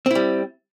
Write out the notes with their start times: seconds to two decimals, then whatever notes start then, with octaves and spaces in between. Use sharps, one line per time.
0.06 C4
0.11 E4
0.15 G3